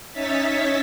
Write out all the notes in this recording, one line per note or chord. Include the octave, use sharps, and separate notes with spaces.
C#4 D#4 C#5 E5 A6 B6